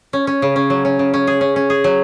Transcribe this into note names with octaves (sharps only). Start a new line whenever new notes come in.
C#4
C#4
C#3
C#4
F#3
C#4
C#3
C#4
G#4
C#4
C#4
G#4
F#3